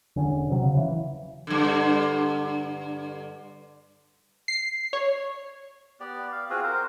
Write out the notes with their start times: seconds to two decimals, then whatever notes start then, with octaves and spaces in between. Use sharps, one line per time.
0.16 E1 D3 C#4
0.50 C3 F#3
0.63 C#3
0.77 E3
1.47 G2 D3
4.48 C7
4.93 C#5
6.00 B3 G4 D5
6.32 F5
6.50 C4 F4 F#4 G#4
6.64 A#4 C5